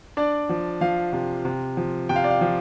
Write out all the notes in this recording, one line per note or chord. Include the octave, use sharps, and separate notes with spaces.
D4 D5
F3
F3 F5
C3
C3
F3
C3 G5
F5
D5
F5
F3